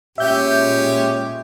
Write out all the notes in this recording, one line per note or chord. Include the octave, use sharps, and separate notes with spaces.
A#2 G#3 C#4 G4 E5 G6